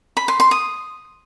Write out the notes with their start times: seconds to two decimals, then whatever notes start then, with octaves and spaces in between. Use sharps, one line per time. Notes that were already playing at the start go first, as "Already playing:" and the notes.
0.17 B5
0.28 C6
0.40 C6
0.51 D#6